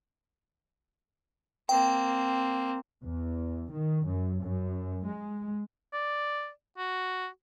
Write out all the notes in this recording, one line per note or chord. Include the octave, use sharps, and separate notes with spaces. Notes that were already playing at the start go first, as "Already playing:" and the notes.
A#3 C4 G5
E2
D#3
F#2
F#2
G#3
D5
F#4